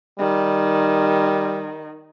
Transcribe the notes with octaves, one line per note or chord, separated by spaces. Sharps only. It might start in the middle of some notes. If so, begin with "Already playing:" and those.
D#3 G3